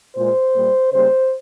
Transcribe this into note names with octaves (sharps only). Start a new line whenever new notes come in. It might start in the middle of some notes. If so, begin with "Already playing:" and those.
A#2 G#3 C5
A#2 G3 A#3
C#3 G3 A#3 C5